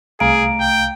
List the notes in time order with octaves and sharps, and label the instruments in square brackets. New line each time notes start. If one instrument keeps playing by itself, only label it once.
[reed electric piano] C2 F5 [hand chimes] A3 A#5 D7 [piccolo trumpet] G#4
[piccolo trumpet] G5